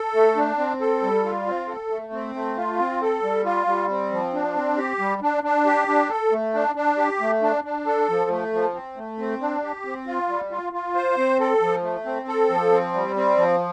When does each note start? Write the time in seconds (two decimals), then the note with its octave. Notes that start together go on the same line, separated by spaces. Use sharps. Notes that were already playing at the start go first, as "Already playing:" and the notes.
Already playing: A4
0.14 A3
0.36 D4
0.58 C4
0.81 A4
1.02 G3
1.25 F4
1.47 C4
1.69 A4
1.91 A3
2.13 C4
2.35 A3
2.57 F4
2.79 C4
3.02 A4
3.23 G3
3.45 F4
3.67 G3
3.89 C4
4.12 F3
4.34 D4
4.56 C4
4.78 G4
4.99 G3
5.22 D4
5.44 D4
5.66 G4
5.88 D4
6.10 A4
6.32 A3
6.54 D4
6.76 D4
6.98 G4
7.20 A3
7.42 D4
7.64 D4
7.86 A4
8.09 F3
8.31 A3
8.53 F3
8.74 C4
8.97 A3
9.19 C4
9.41 D4
9.63 G4
9.85 C4
10.07 F4
10.29 G3
10.51 F4
10.73 F4
10.95 C5
11.17 C4
11.40 A4
11.61 F3
11.83 A3
12.06 C4
12.28 A4
12.50 F3
12.72 C4
12.94 G3
13.16 C4
13.38 F3